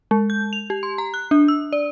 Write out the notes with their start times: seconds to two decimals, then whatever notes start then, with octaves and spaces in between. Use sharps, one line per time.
0.11 G#3
0.30 G6
0.53 F7
0.70 G4
0.83 C6
0.98 A#5
1.14 F#6
1.31 D4
1.48 E6
1.73 D5